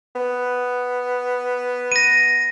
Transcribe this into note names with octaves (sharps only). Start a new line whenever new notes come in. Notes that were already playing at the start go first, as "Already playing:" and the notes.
B3
A#6 D#7